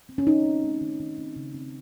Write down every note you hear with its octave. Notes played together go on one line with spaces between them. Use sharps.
C4
C#4
D#3 D#4
C4
A3
D#3
D#3
C4
C#3
C4